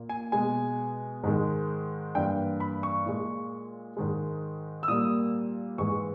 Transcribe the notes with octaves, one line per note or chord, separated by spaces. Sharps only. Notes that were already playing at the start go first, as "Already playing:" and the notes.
Already playing: A#2 A#3
G#5
B2 G#3 G#5
G#2 D#3 G#3
G2 E3 A#3 G5
B5
C#6
A#2 G#3
G#2 D#3 G#3
E6
A#2 G3 A#3 D#6
G#2 E3 G#3 C#6